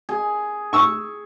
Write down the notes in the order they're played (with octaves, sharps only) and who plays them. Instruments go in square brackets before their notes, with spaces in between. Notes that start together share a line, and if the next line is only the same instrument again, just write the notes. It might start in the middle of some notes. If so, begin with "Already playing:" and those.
[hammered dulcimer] G#4
[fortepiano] C#6 E6